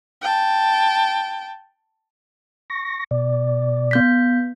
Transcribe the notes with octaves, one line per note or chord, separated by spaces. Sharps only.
G5 A5
C#6 A#6
B2 D5
B3 G6 B6